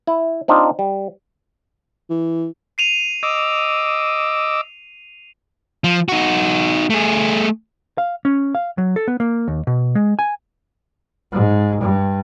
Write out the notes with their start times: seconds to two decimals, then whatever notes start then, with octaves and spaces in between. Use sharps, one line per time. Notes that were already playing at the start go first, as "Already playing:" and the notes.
0.07 E4
0.48 C4 D4 D#4 F4
0.79 G3
2.10 E3
2.78 C7 D#7 F7
3.23 D#5 D6 E6
5.84 F3
6.08 D#4 F#4
6.90 A3 G#4
7.98 F5
8.25 C#4
8.55 F5
8.78 F#3
8.96 A4
9.08 B3
9.20 A#3
9.48 D#2
9.67 B2
9.95 G#3
10.19 G#5
11.32 G#2
11.82 G2